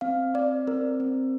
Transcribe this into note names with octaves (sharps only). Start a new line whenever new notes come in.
C4 F5
C4 D5
C4 A#4
C4